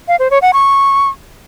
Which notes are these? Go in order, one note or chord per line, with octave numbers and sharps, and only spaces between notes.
F5
C5
C#5
F#5
C#6